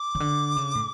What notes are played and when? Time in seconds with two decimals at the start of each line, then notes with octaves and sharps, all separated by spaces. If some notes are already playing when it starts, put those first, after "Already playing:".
Already playing: D6
0.15 C#3
0.20 D3
0.57 C#3
0.75 A2